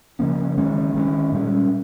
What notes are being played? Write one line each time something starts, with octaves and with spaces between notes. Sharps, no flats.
C#3 F3 A#3 C#4
D#3 G#3 C#4
D#3 G#3 C#4
A#2 G3 C#4